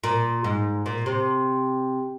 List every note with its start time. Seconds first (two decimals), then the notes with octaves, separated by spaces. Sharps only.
0.04 A#2
0.44 G#2
0.86 A#2
1.06 C3